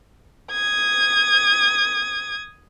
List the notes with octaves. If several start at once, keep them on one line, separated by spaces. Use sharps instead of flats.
D#6 G#6